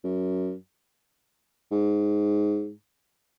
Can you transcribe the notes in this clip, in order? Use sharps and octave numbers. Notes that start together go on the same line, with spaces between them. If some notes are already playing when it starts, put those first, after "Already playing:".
F#2
G#2